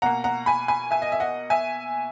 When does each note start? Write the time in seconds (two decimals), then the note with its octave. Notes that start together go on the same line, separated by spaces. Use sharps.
0.02 B2 A#3 F#5 A#5
0.24 F#5 A#5
0.46 G#5 B5
0.68 G#5 B5
0.91 E5 G#5
1.02 D#5
1.12 E5
1.20 D#5 F#5
1.50 E5 G#5